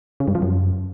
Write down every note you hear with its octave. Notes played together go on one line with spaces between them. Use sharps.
C#3
G2
F3
F#2